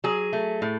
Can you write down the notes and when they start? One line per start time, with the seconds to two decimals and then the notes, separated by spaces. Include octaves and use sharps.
0.04 F#3 G#4
0.33 A3
0.62 A2